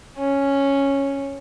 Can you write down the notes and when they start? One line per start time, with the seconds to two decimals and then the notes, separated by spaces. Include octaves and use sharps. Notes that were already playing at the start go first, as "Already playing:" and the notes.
0.19 C#4